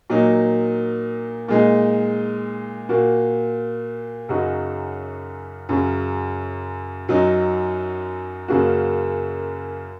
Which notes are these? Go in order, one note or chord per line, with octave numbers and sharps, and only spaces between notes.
A#2 F#3 A#3 D#4
A#2 G#3 D#4
A#2 A#3 F#4
F#2 C#3 F#3 D#4 F#4
F#2 C#3 F#3
F#2 F#3 D#4
F#2 C#3 A#3 F#4